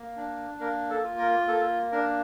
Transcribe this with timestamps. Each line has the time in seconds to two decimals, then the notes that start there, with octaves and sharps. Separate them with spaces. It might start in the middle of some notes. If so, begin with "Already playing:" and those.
Already playing: A#3
0.16 D4
0.60 A#3 A#4
0.90 A4
1.04 F4
1.19 A#4
1.48 A#3 A4
1.92 D4 A#4